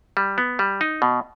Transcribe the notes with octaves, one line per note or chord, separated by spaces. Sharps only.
G3
B3
G3
D#4
B2